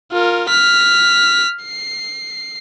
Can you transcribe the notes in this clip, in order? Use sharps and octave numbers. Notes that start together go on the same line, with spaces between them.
F4 A#4
F6 B6
C7